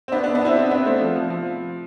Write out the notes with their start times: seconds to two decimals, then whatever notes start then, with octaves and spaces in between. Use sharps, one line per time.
0.08 C4
0.12 B3 D4
0.23 B3 D4
0.34 B3 D4
0.45 C4 E4
0.56 C4 E4
0.71 B3 D4
0.86 A3 C4
1.00 F3
1.16 F3
1.30 F3